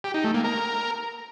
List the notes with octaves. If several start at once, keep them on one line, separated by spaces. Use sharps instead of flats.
G4
D#4
A3
A#3
A#4